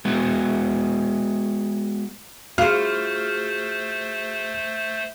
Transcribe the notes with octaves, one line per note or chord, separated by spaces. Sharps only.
G#3 B3 F#4
A3 F4 F#4 G#4 C5 F6